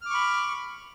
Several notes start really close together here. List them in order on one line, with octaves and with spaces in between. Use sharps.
F6 D6 C#6 B5